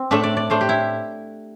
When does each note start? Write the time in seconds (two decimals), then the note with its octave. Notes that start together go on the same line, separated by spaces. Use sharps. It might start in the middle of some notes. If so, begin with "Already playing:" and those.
Already playing: C4
0.11 A2 A3 D4 E5
0.24 D5
0.37 D5
0.50 A2 A3 D4 C5
0.61 G4
0.69 E4